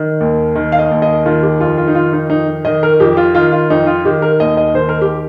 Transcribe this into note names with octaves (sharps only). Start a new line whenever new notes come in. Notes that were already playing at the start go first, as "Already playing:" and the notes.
Already playing: D#3
D#2
D#3
F5
D#5
D#2
D#5
D#3 F4
G4
F2 F4
F4
D#4
D#3 F4
D#4
F2 D#4
D#3 D#5
A#4
F2 G4
F4
D#3 F4
F4
F2 D#4
F4
D#3 G4
A#4
D#2 D#5
D#5
D#3 C5
A#4
G4